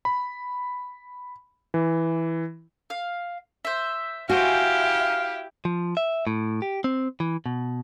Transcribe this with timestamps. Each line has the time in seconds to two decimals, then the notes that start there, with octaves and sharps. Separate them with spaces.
0.05 B5
1.74 E3
2.90 F5
3.65 C5 E5
4.29 E4 F#4 G4 C5 F5 G5 G#5
5.65 F3
5.97 E5
6.27 A2
6.62 G4
6.84 C4
7.20 E3
7.46 B2